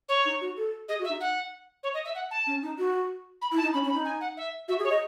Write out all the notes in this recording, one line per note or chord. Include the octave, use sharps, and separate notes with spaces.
C#5
D#4
F#4
A4
G#4 D#5
F#4
E5
D#4
F#5
C#5
D#5
E5
F#5
A5
C#4
D#4
F#4
B5
E4
A5
D#4
C#4 B5
C#4
B5
D#4
G#5
F#5
E5
F#4 E5
G#4
C#5
D#5